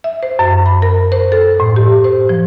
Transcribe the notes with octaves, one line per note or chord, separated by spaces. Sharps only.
E5
C5
F#2
B5
A#4
C5
A4
A2
G4
C5
F3